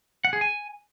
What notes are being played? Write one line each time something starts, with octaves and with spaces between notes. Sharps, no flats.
F#5
G#4
G#5